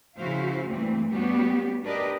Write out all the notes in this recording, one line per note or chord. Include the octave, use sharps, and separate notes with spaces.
C#3 F3 E4 F#4 C5 F5
D2 G2 E3 A#3 C4
G3 B3 C#4 F#4 G4
D4 G4 A#4 B4 D5 D#5